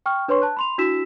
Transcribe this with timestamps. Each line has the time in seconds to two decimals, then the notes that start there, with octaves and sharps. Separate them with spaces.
0.06 G5 C#6 F6
0.28 D4 B4 C#5 C6 C#6
0.42 A5 F#6
0.57 B5 C6 F7
0.78 D4 E4 F#4 E6 B6 E7